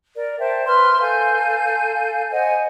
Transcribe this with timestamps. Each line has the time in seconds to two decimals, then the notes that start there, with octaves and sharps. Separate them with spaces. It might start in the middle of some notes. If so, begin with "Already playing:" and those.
0.15 A#4 D5
0.40 C5 E5 G5 A5
0.65 B4 C6 F6
1.00 A4 F5 G#5 G6
2.31 C5 D#5 F#5 G#5